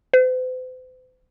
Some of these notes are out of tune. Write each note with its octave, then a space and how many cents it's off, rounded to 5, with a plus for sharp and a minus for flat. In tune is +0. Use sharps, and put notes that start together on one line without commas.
C5 -45